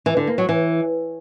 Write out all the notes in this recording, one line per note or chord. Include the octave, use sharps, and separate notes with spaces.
E3
D3
A#3
F#3
E3